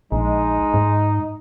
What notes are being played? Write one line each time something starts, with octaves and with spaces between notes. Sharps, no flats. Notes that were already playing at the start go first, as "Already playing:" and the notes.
A#1 G#3 D#4
G#2